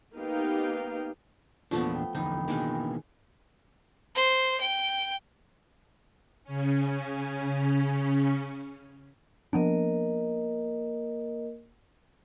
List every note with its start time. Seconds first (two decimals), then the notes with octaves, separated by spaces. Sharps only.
0.16 A#3 B3 D#4 G4 F5 G5
1.71 E2 A#2 F3 A3 B3 D4 C#6
1.94 G5
2.15 E2 D3 F3 D4 D#4 G5 B5
2.48 B2 D#3 E3 G#3 A#3 D#4
4.15 C5
4.61 G5
6.44 C#3 C#4
9.53 F3 A#3 B3 D4 A#4 D#5